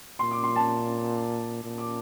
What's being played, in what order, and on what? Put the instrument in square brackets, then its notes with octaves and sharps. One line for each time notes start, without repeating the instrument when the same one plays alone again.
[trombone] A#2 [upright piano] C6
[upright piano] D6
C6
A5
[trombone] A#2
[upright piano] D6